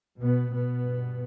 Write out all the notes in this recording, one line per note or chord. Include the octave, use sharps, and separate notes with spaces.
B2 B3
B2 B3
G2